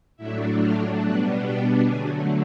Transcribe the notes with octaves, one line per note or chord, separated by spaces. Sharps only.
A2 F#3 A3 D4 E4 E5
F4 F5
B2 G3 B3 D4 F#4 F#5
G4 G5
D3 F#3 A3 G#4 G#5